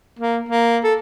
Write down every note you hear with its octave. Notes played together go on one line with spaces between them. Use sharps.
A#3
A#3
A4